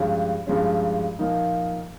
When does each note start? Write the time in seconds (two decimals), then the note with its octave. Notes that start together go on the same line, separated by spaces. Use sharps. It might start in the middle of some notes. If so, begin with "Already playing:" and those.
Already playing: G2 F3 G#3 C#4
0.47 G2 F3 G#3 C#4
1.19 A#2 F3 A#3 D#4